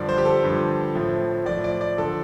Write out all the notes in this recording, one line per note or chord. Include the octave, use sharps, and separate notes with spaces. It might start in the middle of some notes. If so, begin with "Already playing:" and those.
Already playing: G2 D3 F3 D5
C5
G4
A4
G2 D3 F3
A2 F3
A2 F3 D5
D5
D5
D3 F3 A4